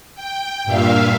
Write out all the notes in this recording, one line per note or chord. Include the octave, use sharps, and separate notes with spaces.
G5
G2 A#2 E5 F5